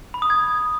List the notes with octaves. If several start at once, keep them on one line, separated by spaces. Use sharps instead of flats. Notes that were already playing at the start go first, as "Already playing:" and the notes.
B5
D#6
G#6